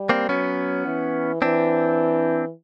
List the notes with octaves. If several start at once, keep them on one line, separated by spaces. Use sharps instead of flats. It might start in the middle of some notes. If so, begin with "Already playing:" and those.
Already playing: G3
A#3 C4
F#3 B3 C#4
E3
E3 C4 D4